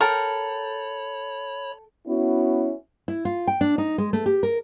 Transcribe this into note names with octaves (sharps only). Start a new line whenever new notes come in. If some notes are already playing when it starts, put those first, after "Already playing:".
A4 A#4 C#5 G5 B5
B3 C#4 E4 F#4
E4
F4
G5
D4
D#4
G#3
A3
G4
A#4